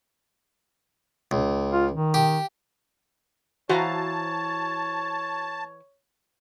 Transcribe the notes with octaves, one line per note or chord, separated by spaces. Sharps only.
C#2
F4
D#3
G4
E3 F#4 C5 C#5 F5 A5 A#5